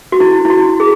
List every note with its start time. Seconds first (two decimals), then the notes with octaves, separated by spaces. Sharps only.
0.12 F#4
0.20 E4
0.45 E4
0.50 F#4
0.80 G#4